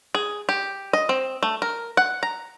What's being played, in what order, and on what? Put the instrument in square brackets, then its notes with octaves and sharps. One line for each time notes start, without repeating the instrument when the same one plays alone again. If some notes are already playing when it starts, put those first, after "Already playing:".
[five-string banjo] G#4
G4
D#5
C4
A3
A#4
F#5
A#5